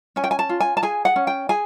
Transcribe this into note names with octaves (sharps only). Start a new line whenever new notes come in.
C#4 G#5
G5
G#5
A5
F4
G#5
A5
G#4 G#5
F#5
C#4
G5
G#4 G#5